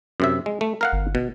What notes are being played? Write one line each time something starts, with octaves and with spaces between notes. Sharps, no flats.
F#2 C3 E5
G#3
A3
A#4 F5 F#5
G1
B2